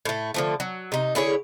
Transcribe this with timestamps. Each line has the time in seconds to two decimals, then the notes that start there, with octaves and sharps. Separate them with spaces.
0.05 A2 A3
0.34 D3 F3 A3
0.60 F#3
0.92 C3 D#4
1.15 D3 E4 G#4 C#5